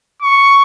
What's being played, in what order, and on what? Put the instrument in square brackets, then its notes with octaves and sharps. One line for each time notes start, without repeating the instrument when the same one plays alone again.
[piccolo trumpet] C#6